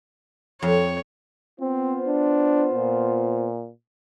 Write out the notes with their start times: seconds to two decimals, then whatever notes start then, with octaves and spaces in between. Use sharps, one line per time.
0.62 F2 C#5
1.60 B3 C4 F4 C5
2.07 D4
2.73 A#2